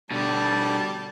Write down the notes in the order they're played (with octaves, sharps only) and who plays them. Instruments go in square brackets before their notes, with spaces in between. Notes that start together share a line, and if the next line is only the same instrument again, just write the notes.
[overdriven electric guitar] B2 D3 [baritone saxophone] G3 [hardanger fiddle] A5